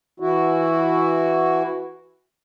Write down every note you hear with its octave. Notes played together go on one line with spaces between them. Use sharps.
E3 E4 F#4